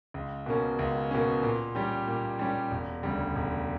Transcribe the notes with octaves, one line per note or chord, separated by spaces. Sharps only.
C#2
B2 A#3 C#4
C#2
B2 A#3 C#4
A#2
G3 C#4 G4
A#2
G3 C#4 G4
E1
D2 C#3 G3
E1